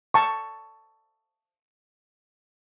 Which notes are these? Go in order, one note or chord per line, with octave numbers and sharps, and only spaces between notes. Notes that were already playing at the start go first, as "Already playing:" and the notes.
A5 C#6